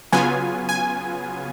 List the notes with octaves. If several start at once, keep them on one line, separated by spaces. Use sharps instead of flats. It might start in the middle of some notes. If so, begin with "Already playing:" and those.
C#3 F#3 B3 F4 G#5
G#5